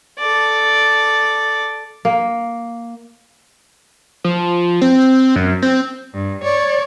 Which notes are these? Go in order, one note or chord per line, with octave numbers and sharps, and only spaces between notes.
A4 D5
A#3
F3
C4
F#2
C4
G2
C#5 D5